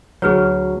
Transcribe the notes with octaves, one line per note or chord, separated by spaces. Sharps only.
D2 F#3 G#4 B4 C#5